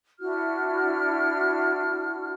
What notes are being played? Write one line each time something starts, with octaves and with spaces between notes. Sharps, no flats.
D4 E4 F#4 F6